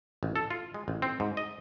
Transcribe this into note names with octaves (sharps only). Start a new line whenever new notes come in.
A1
A4
F4
G#3
A1
C4
G#2
D#5